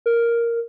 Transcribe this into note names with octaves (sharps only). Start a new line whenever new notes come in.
A#4